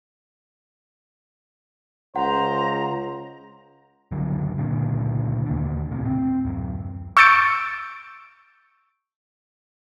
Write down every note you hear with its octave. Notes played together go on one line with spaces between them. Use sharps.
C#2 C5 F#5 A#5
F#1 C#2 D3 F#3
C#2 A#2 D3
D#2 D3
D#1 A2 C3
C4
D1 F#2
C#6 E6 G6 A6 C#7 D7